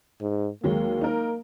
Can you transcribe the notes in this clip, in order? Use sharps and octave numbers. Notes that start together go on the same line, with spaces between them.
G#2
D#2 F#3 G#3 A#3
D#4 A#4